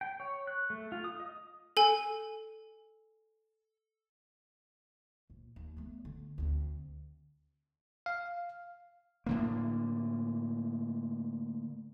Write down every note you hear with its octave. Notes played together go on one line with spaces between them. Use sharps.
G5
C#5
F#6
A3
F4
D#6
D#5
A4 G#5
A#1
D#2
A3 B3
D3
D2 C4
F5
A2 D3 A#3